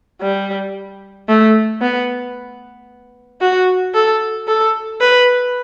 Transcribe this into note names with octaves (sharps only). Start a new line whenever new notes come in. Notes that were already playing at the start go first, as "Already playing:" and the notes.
G3
A3
B3
F#4
A4
A4
B4